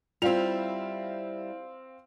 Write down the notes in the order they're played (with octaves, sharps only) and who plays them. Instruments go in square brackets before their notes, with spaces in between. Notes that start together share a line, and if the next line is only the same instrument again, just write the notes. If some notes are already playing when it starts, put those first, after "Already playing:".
[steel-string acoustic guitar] G3 E4 [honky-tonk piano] C4 F5 F7 [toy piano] F4